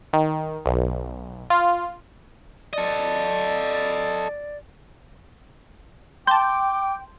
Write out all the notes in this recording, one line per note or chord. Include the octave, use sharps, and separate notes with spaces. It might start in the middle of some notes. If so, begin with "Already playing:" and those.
D#3
B1
F4
A4 D5 D#5
G5 A5 C6 D6 G6